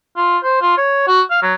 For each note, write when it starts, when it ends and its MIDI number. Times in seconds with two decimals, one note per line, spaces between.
0.16 0.37 65
0.43 0.57 72
0.62 0.76 65
0.77 1.07 73
1.07 1.22 66
1.30 1.39 77
1.42 1.54 54